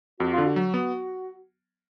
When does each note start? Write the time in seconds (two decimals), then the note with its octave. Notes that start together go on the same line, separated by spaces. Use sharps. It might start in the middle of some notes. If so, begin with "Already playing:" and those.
0.20 F2 F#4
0.32 F4
0.38 D3
0.45 F#4
0.56 F#3
0.74 B3